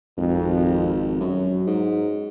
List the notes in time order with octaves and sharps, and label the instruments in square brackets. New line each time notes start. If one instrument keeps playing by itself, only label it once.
[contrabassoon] G#1 [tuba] F2
[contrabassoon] F#2 [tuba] F#3
[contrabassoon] G#2